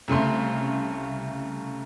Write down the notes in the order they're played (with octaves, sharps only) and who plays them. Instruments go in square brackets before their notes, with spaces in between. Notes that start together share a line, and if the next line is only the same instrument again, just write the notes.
[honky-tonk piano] C2 C#3 A3 C6